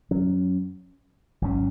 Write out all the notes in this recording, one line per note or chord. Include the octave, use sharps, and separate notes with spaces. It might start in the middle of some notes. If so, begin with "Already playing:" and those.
F#2 F#3 C#4
G#1 G#2 F#3 C#4